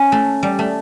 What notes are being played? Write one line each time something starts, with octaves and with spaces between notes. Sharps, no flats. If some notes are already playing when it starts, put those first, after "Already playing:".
Already playing: C#4
A3
G3
A3